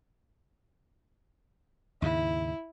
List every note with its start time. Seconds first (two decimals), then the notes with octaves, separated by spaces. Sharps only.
2.02 D#2 G#2 C#3 E4